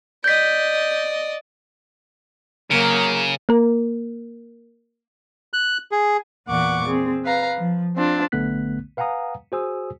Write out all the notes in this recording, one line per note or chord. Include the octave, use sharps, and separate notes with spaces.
D5 D#5 G6 B6
C#3 F#3 A#3
A#3 A#4
F#6
G#4
E2 A#2 E3 F#5 C#6 D6
C4 G#4
B4 F5 A#5
F3
C4 D4 F4
B1 D3 A3 B3 F#6 B6
B4 F5 F#5 G#5 A#5 D#6
F#4 G#4 C5 G#5 D#6 E6